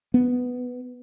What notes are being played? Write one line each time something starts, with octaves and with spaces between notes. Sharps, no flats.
B3